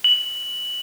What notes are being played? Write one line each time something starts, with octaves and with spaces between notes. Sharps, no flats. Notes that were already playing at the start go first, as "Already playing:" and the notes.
F#7